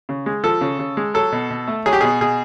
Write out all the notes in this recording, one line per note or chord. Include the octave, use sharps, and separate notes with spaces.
C#3
G#3
F3 A4
C#3
C#3
G#3
F#3 A4
B2
B2
A3
F#3 G#4
G4
B2 G#4
B2 G#4